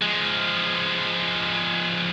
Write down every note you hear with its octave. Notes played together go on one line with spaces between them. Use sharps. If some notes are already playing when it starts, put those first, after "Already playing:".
F3 G#3